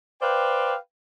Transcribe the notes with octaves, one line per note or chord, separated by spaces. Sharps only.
B4 C5 D5 F5 G5